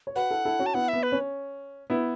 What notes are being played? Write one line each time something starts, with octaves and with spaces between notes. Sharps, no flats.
C#5
F#4 B4 F#5
E4 A4
E4 A4
C#4 F#4
A5
B3 E4 F#5
B3 E5
B4
C#4
B3 E4